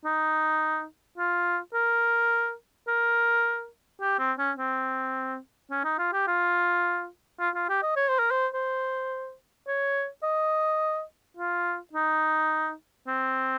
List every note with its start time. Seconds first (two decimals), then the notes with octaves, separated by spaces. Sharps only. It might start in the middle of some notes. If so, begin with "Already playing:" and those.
0.05 D#4
1.18 F4
1.74 A#4
2.88 A#4
4.01 G4
4.19 C4
4.38 C#4
4.57 C4
5.70 C#4
5.84 D#4
5.98 F4
6.13 G4
6.27 F4
7.40 F4
7.55 F4
7.69 G4
7.83 D#5
7.96 C#5
8.09 C5
8.19 A#4
8.31 C5
8.54 C5
9.67 C#5
10.23 D#5
11.37 F4
11.93 D#4
13.07 C4